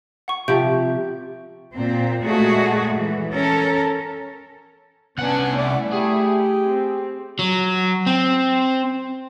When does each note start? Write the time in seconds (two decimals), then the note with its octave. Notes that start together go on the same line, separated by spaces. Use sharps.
0.28 F#5 C#6
0.48 C3 F3 G4 E5 G6 D7
1.74 A#2 C4
2.22 A#2 G#3 A3 F#4 G#4
2.95 E3
3.32 C#4 A4 A#4
5.18 C2 B3 C#4 D4 F#5 G#5
5.57 A3 E4 D5
5.93 G4 G#4
6.65 C4
7.39 F#3
8.06 C4